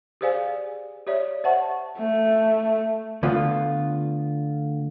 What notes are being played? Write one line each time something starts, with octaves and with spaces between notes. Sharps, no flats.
G4 G#4 C5 D5 F5 G#5
G4 C#5 D5 E5
C5 E5 F#5 A5 C#6
A3
D3 A3 B3 F4